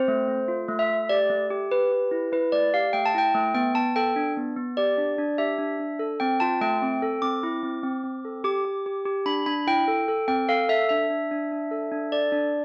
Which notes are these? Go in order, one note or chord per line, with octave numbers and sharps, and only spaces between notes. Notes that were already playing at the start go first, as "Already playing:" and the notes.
Already playing: C4 C5
A3
A3
F4
A3
E5
A3
G4 D5
A3
G4
G4 B4
G4
E4
E4 B4
A3 D5
G4 F5
A3 G5
A5
E4 G5
A3
B3 G5
B3 A5
A4 G5
D4
B3
B3
G4 D5
D4
D4
G4 E5
D4
D4
A4
C4 G5
F4 A5
A3 G5
C4
A4
C4 D6
E4
C4
C4
C4
A4
G4 D6
G4
G4
G4
D4 B5
D4 B5
E4 G5
A4
A4
C4 G5
A4 F5
A4 E5
D4 E5
D4
D4
D4
A4
D4
A4 D5
D4